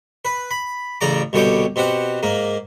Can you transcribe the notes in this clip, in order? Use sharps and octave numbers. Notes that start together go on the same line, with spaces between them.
B4
B5
A1 C#3 D5 A#5 D6
C2 B2 D3 C#5 G5 D6
B2 C4 G4 F#5
G#2 A#3